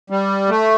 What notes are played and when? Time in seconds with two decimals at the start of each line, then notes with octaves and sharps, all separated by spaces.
0.10 G3
0.49 A3